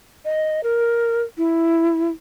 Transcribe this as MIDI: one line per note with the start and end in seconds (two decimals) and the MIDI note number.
0.25 0.61 75
0.63 1.22 70
1.37 2.10 64